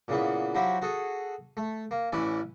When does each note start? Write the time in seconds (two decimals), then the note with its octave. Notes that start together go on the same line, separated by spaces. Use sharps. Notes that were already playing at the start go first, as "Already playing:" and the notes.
0.08 A#2 C#3 E3 B3
0.55 F3 F#3 E4 F#4 G4
0.82 F#4 G#4 A4
1.57 A3
1.91 A#3
2.12 A1 E3 C#4 E4 D5